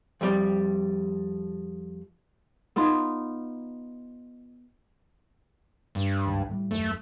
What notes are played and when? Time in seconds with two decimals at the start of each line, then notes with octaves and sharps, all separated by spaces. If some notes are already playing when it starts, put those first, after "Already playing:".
0.21 F2 G3
2.76 B3 D#4 F4
5.95 G2
6.25 G#1 C#2
6.49 A2 F#3 G3
6.71 D#1 A#1 F#2 A3